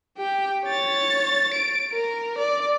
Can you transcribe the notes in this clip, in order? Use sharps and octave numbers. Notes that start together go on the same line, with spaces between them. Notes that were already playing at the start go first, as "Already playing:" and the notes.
G4 G5
C#5 A6
D7
A#4
D5